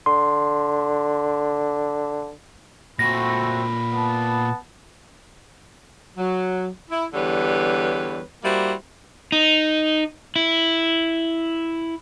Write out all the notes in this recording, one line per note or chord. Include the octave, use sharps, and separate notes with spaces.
D3 C6
A#2 A3 C4 F#4 B4 B5 A#6
B3 A5
F#3
E4
E2 D3 G3 B4 C#5
G3 A#3 E4 F#4 C5
D#4
E4